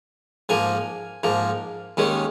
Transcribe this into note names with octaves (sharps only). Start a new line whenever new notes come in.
G#2 F3 A#3 G#5
G#2 F3 A#3
D#2 D#3 G#3 C#4